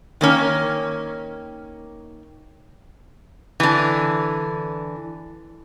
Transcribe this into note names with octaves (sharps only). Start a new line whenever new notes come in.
D#3 A#3 C#4
D3 E3